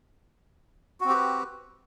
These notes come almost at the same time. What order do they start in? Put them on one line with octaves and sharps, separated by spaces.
F#4 C4 G4 B4